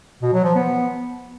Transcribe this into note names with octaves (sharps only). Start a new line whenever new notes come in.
B2
F#3
F3
B3